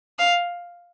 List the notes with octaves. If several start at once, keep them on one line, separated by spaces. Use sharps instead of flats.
F5